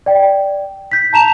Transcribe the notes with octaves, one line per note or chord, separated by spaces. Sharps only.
D5 G5
G6 B6
A5 A#5 E7 F7